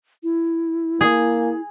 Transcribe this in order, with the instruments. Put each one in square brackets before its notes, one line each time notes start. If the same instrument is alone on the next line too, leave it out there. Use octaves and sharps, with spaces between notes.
[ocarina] E4
[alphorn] A#3 [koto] G#4